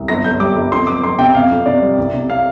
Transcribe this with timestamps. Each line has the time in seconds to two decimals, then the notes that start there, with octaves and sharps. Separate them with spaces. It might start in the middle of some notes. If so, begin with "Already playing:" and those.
Already playing: C2
0.08 G1 A#6
0.24 G1 G6
0.40 G3 D6
0.56 G1
0.72 F2 C6
0.87 F1 D6
1.03 F1 C6
1.18 C3 G5
1.35 C3 F5
1.51 F2
1.66 C3 D5
1.82 G3
1.98 C2
2.14 C3
2.30 F5